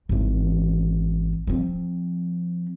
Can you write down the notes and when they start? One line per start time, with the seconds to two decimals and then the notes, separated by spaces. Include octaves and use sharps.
0.09 G#1 E3
1.47 F3 C4